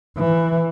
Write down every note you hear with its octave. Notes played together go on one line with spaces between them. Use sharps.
E3